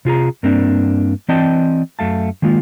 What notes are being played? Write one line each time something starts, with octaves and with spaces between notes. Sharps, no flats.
C3 F4 G#4 A#5
G2 A#3 C4 D4
E3 C4 D5 D#5 G5 A5
F#2 A3 F5 A5
D#3 G#3 A#3 F4